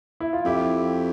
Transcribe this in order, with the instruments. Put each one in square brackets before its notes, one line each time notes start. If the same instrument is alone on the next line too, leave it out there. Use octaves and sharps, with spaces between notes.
[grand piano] E4
F4
[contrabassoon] F2 [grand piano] E4 G4